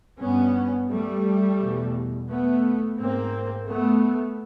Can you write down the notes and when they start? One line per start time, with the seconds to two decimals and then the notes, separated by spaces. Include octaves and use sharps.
0.19 G2 B3 C#4
0.89 G3 A3
1.58 E2 B2
2.28 A3 B3
2.98 G#2 A#3 C4
3.67 A3 B3